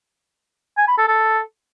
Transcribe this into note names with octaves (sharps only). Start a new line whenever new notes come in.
G#5
B5
A4
A4